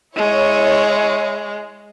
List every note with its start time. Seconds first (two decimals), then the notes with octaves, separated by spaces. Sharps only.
0.17 G#3 E4 C#5